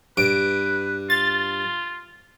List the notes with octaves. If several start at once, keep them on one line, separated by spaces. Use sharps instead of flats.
G2 B4 D7
F4 A6